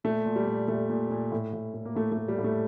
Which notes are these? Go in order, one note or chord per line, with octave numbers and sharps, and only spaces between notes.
A#2 A3
A#2
G3
A#2
A#2 A3
A#2
A#2
A2
A2
A2
A#3
A2 A3
A3
A2
G3
A2
A3